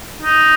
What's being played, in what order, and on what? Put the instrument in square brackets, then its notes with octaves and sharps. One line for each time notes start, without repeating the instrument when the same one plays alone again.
[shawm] D#4